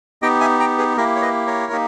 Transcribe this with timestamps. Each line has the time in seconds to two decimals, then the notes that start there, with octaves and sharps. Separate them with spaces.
0.22 B3 D#4 G4 D#5 G5
0.40 E5 G#5
0.60 G5 A#5
0.78 G#4 B4
0.97 A#3 E4 G4 A#4
1.16 C#5
1.22 B4 D#5
1.47 A#4 C#5
1.72 A#3 D#4 G4